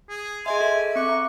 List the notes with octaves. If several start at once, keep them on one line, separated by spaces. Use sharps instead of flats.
G#4
G#4 D#5 E5 G#5 C6
A4 E5
C4 C#6 D6 F#6
A#5